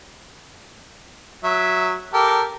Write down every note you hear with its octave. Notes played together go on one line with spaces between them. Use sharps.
F#3 E5
G4 A4 A#4